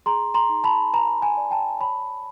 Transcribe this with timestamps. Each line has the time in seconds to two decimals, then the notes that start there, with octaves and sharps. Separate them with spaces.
0.06 G#4 A#5 C6
0.34 A#5 C6
0.49 D#4
0.64 A5 B5
0.93 B4 G#5 A#5
1.22 G#5 A#5
1.37 D5
1.51 G5 A5
1.80 C#5 A5 B5